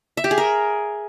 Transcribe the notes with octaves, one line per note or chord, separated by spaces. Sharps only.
E5
G4
G#4
A#4